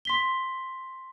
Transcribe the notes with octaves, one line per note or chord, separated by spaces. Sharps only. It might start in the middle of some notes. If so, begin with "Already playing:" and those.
C6 B6 G7